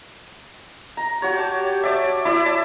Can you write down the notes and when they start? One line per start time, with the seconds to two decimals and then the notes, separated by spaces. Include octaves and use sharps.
0.97 A#5
1.22 F#4 G4 C#5
1.38 A5
1.83 C#5 D5 E5
2.25 E4 D5 E5
2.46 A5